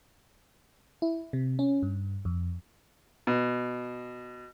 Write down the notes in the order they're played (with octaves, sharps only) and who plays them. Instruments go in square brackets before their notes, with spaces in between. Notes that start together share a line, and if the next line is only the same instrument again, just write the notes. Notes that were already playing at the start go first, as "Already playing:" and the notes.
[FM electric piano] E4
C3
C#4
G2
F2
[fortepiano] B2